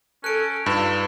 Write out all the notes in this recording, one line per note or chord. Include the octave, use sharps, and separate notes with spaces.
C#4 A4 F#6 G6 D7
G2 D#4 F4 B4 E6